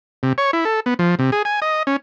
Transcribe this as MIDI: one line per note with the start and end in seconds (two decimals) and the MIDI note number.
0.23 0.33 48
0.38 0.51 73
0.53 0.65 64
0.65 0.80 69
0.86 0.94 59
0.99 1.15 53
1.19 1.31 48
1.32 1.42 68
1.45 1.60 80
1.62 1.83 75
1.87 1.96 61